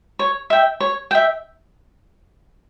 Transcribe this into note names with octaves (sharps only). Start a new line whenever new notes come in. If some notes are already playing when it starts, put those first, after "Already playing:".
C#5
E5 G5
C#5
E5 G5